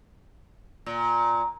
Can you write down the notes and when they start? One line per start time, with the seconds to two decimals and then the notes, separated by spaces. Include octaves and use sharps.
0.86 A#2